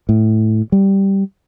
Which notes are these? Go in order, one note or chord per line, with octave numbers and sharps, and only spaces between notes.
A2
G3